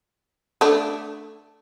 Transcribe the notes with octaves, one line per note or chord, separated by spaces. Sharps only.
A3 D4